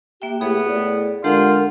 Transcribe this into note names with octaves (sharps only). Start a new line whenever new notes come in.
A#3 G4 E5 G5
A2 B3 G4 G#4
A2 D5
D3 G#3 F4 G4 A#4 F#5